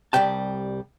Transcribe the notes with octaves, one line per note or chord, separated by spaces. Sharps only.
C2 C3 G3 G5 A5